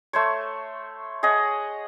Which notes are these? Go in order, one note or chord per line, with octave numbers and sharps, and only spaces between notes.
A3 C5 C#5
G#4 C#5 D#5 F#5